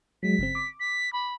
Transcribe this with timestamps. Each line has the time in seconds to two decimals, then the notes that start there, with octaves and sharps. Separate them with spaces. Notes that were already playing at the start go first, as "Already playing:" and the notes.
0.23 F#3 G#3 B6
0.39 G1 C#3 C4
0.55 D6
0.80 B6
1.13 B5